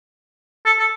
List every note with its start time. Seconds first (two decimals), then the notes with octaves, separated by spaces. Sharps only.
0.66 A4
0.79 A4